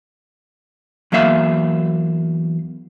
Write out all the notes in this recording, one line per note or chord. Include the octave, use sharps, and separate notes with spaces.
E2 F#3 A#3 E5 F5